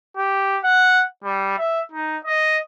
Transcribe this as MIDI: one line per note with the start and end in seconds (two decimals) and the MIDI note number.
0.17 0.58 67
0.64 1.03 78
1.24 1.56 55
1.58 1.81 76
1.92 2.17 63
2.25 2.58 75